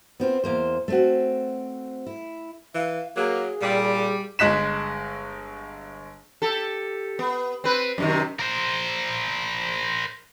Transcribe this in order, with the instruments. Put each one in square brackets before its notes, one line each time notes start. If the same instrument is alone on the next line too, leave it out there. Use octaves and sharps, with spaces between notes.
[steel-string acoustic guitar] B3 C4 F4
E2 A#3 C5
A3 C4 F#4
E4
[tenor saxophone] E3 [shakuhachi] F5
[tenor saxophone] F#3 [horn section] A#3 [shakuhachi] G#4
[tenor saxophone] A#2 [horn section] G3
[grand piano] G1 G#3 D#5 F#6 B6 E7
[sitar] G4 A4
B3
C4 B4
F#2 C3 D#3
[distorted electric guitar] A#4 C5